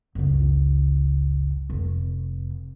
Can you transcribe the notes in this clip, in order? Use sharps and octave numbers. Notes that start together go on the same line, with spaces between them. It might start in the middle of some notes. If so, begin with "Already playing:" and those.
F#1 C#2
F1